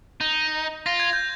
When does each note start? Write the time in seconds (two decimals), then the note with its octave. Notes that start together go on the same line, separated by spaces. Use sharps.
0.21 D#4
0.86 F4 A#6
1.00 G#6
1.13 G6